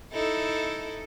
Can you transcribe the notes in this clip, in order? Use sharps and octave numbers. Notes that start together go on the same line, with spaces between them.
D#4 E4 A4